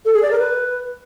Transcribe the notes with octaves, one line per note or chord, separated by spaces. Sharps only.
A4
G#4
D5
A#4
B4